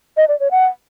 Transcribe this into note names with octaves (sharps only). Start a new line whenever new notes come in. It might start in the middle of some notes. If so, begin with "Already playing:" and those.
D#5
D5
C#5
F#5